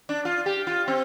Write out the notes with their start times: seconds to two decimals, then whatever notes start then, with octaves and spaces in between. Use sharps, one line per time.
0.09 D4
0.25 F4
0.46 G4
0.67 F4
0.88 C4